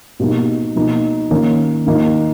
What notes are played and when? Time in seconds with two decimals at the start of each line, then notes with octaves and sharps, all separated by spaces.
0.20 B2 G3 A#3 D#4
0.76 B2 A#3 D#4
1.31 D#3 A#3 C#4
1.86 D#3 A#3 D#4